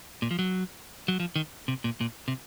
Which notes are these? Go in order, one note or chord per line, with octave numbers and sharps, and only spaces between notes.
A#2
F3
F#3
F#3
F3
D#3
C3
A#2
A#2
C3